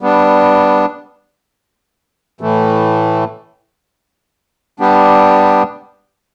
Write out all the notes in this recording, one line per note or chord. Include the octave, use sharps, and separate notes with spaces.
G3 B3 D4
A2 E3 A3
G3 B3 D4 G4